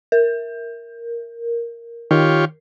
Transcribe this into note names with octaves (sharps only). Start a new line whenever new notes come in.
A#4
D#3 F4 G4 C#5